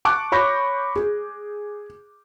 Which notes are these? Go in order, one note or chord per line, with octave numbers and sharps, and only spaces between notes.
A5 C#6 D6 F#6
C#5 B5 C#6 G6 A#6
G#4